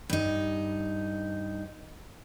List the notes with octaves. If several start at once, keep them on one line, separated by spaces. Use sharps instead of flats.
G2 D#4